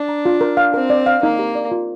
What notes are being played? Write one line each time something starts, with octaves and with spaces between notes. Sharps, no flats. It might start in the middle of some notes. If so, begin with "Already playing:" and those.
Already playing: D4
A#5
F4
A#4
F5
C4 A#4
D5
F5
A#3 D#4
G4
D5
F4